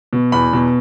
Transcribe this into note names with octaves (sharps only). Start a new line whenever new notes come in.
B2
E2 B5
B2